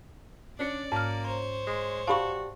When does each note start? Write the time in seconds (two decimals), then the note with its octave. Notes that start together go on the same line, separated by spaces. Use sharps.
0.59 C#4 D4 D5 C#7
0.92 G#2 A#3 F6
1.25 C5 C#5 A#5
1.67 G#3
2.07 F#4 G4 D5 F5 A5 B5 C#6